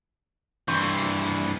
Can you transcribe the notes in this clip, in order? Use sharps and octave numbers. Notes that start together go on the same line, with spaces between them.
G2 E3 C6 C#6 G6